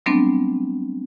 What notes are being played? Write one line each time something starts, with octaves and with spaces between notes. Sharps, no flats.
F#3 G3 A3 B3 C4 D4